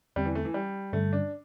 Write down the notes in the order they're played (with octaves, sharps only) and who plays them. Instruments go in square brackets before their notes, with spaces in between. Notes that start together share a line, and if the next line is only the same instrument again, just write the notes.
[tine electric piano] E2 D3 C4 [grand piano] G3
[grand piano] E3
A3
E3
G3
[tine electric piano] G2 D3 G3 [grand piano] A3
[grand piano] D4